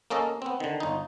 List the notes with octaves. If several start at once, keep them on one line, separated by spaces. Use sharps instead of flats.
A#3 C#4 A4 D#5
B3 C4
D3 D#3
G1 D#4